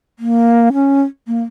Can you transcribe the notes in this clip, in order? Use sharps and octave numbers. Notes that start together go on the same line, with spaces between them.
A#3
C#4
A#3